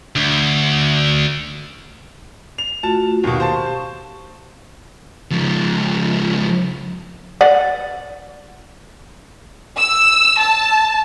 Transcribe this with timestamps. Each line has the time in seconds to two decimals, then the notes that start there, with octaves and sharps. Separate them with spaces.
0.16 D2
2.58 F7
2.83 A3 F4 F#4 A5
3.24 D#2 B2 G4 F5 C#6
3.40 C5 A5
5.31 C#2 F3
7.41 B4 D5 F#5
9.77 E6
10.40 A5